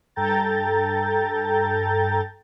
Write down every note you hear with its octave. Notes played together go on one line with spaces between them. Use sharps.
G2 A4 G5 A#5 G6 A6